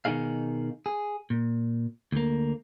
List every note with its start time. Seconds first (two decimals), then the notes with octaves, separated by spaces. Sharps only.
0.05 B2 D#3 G#3 D#4 G#4 F5
0.86 G#4
1.30 A#2
2.12 D2 A#3